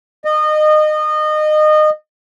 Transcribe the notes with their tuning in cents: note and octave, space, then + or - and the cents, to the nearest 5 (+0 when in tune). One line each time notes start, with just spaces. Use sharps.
D#5 -25